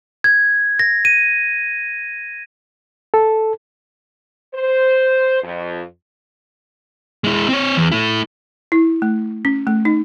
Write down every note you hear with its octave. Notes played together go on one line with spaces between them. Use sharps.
G#6
A#6
D#7
A4
C5
F2
G#3 E4
C4 C#5
E2
A3 E4
E4
A3
C#4
A3
D#4